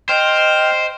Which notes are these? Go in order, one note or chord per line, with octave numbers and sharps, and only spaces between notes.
C5 D#5 G5 F6